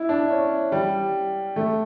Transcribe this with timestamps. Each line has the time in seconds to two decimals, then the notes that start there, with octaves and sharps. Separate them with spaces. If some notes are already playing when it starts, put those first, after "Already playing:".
Already playing: E4
0.09 D4
0.30 C#4
0.72 G3
1.56 A3